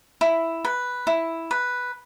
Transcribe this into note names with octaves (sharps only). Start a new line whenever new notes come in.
E4
B4
E4
B4